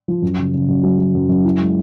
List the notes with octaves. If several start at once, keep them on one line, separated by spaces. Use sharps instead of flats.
F3
F#2
C#3
C#3
F#2
F#3
F#3
F#2
F#2
E4
G#3